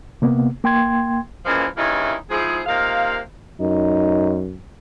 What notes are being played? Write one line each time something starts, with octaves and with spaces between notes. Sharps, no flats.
C3 A#3 B3
A#3 G5 C6 G#6
A#2 E3 F3 G#3 A#3 C#4
G2 C#3 A#3 D#4 E4
G#2 F3 E4 G#4
C3 A#3 D#4 F4 F5
F#2 D#4